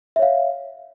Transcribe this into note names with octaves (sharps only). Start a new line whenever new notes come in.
C#5 E5 F5